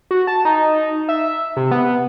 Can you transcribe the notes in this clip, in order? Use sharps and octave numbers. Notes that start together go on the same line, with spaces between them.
F#4
A5
D#4
E5
C3
B3